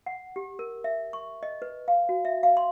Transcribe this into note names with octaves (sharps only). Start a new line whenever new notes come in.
F#5
G4
A#4
E5
C#6
D#5
B4
F5
F#4
E5
F5
C6